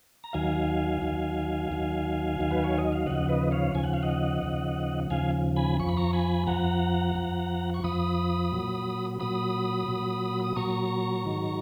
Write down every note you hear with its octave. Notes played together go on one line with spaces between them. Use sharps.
A#5
D#2 D#3 F#3 F5 G#5
D#2 D#3 F#3
D#2 D#3 F#3
D#2 D#3 F#3
B4
C#5
D#5
F5
D#2 C#3 F3 D#5 F#5
B4 D#5
C#5 F5
D#2 C#3 F3 G#5
F#5
F5
D#5 F#5
D#2 C#3 F3
D#2 C#3 F3 F5 G#5
G#5 B5
F2 F3 C#6
B5
A#5 C#6
G#5 B5
F2 F3 F#5 A#5
F2 F3
C#6
F2 F3 B5 D#6
A#2 F#3
A#2 F#3 B5 D#6
A#2 F#3
D#6
A#2 F#3 A#5 C#6
G#2 D#3 F#3